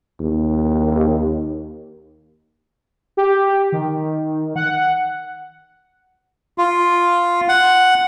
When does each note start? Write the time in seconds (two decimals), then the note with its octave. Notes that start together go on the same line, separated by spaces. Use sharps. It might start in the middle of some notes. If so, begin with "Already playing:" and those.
0.20 D#2
3.17 G4
3.72 D#3
4.56 F#5
6.58 F4
7.48 F#5